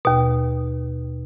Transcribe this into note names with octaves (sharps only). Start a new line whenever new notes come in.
D#2 B2